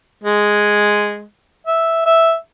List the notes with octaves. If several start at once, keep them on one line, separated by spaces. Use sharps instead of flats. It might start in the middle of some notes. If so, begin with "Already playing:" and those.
G#3
E5
E5